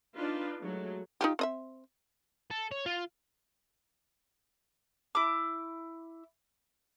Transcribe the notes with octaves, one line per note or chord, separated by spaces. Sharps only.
D4 D#4 F4 B4
F#3 G#3 A3
D#4 F4 G4
C4 D#5 E5
A4
C#5
F4
E4 D6